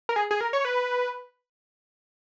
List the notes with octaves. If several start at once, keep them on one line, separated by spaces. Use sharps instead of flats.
A#4
G#4
G#4
A#4
C#5
B4